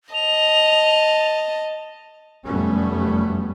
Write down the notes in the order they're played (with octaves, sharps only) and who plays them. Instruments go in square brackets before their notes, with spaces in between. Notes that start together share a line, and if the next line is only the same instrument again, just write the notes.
[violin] D#5 A5 [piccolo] F7
[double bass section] F1 F#2 G3 A3 B3 C#4